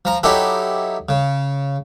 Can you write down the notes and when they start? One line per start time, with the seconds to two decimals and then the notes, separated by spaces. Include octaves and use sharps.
0.05 F3 A#5
0.23 F#3 D#4 E4 G4 A4
1.09 C#3